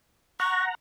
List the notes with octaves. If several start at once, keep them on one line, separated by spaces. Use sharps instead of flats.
F#5 A#5 C#6